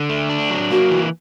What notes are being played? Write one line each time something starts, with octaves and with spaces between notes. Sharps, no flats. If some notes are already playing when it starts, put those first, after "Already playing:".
Already playing: D3
A3
D4
F#3
A#3 F#4
E3